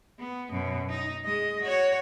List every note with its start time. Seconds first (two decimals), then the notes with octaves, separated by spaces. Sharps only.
0.19 B3
0.51 F#2 B2
0.89 D#4
1.25 G#3 D#5
1.62 F#4 C#5